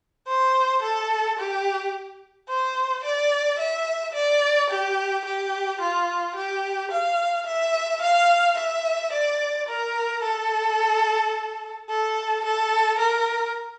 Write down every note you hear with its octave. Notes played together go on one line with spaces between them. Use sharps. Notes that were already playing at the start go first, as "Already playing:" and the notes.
C5
A4
G4
C5
D5
E5
D5
G4
G4
F4
G4
F5
E5
F5
E5
D5
A#4
A4
A4
A4
A#4